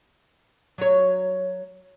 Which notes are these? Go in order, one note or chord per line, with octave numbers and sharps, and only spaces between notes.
F#3 C#5